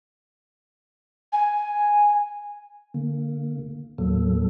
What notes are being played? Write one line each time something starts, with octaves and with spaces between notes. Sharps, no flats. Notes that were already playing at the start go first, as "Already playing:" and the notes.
G#5
D3 A#3
D#2 A2 F#3 A#3 A4